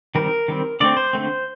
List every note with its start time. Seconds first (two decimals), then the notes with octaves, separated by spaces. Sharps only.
0.15 D#3 G3 C4 A#4
0.48 D#3 G3 C4
0.80 D3 A3 C4 D5
0.97 C5
1.13 D3 A3 C4